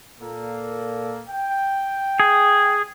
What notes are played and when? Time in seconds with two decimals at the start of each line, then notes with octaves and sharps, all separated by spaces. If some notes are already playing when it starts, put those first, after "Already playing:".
0.20 A#2 A#3 A4
1.28 G5
2.20 G#4